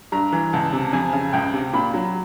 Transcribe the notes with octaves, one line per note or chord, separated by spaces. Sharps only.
G2 A#5
E3
C#2 A5
C3
F2 G#5
C#3
C#2 G5
C3
A#2 B5
F#3